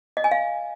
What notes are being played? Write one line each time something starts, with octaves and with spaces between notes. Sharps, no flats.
D#5
G#5
F5